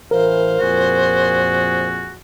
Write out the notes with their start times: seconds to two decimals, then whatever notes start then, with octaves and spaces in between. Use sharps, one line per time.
0.11 A1 E3 A#4 C5 F5
0.60 F2 A#2 F#4 G#4